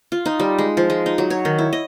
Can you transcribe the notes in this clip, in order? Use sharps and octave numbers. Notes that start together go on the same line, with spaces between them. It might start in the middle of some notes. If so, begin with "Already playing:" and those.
F4
D#4
G3
G#3
F3
G#3
D#4
F#3
C#5
D#3
E4
D#5